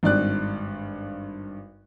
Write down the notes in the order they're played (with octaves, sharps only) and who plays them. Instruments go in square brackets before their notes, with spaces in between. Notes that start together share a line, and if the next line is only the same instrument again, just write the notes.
[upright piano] G#1 G2 D5 F#6